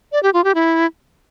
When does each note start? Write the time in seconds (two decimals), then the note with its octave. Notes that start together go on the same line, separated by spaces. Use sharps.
0.12 D5
0.23 G4
0.34 F4
0.44 G4
0.55 E4